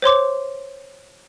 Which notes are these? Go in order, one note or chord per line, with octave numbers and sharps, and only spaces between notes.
C5 C#5 C6 D6